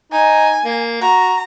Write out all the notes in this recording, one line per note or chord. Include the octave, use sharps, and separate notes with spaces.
D#4 G#5
A#3
F#4 A#5